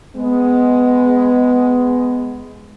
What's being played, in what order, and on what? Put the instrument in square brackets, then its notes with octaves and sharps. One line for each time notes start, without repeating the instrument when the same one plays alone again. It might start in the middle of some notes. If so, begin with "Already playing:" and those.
[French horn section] G#3 B3